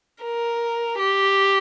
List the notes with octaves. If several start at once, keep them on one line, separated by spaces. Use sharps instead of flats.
A#4
G4